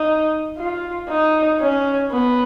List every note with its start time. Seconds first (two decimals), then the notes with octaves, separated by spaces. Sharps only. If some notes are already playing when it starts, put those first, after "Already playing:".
Already playing: D#4
0.58 F4
1.09 D#4
1.60 C#4
2.12 B3